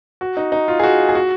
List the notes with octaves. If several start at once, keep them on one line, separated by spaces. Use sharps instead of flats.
F#4
D#4
D#4
F4
G#4
F#4
G#4
F#4